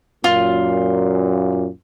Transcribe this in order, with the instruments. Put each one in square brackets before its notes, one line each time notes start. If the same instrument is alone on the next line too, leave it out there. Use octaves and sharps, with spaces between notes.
[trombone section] F#2 A#2 [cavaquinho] F4